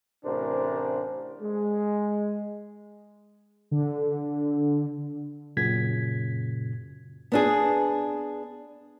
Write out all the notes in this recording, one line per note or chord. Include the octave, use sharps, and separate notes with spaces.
A1 A2 C3 D4 A#4 C5
G#3
D3
F#2 A#2 C#3 G#6 B6
B3 D4 G#4